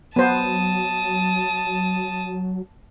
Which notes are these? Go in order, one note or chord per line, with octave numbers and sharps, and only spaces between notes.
F#3 B3 C5 A5 D#6